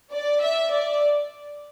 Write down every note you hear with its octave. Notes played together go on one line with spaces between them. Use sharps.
D5
E5
D5